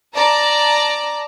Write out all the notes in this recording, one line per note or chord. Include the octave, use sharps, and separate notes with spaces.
D5 A5 A#5